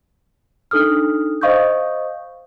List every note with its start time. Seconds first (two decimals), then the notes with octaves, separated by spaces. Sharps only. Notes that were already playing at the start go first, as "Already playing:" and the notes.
0.71 D4 D#4 A4 D#6 F6
1.41 C5 D#5 F5 C#6 D#6 G6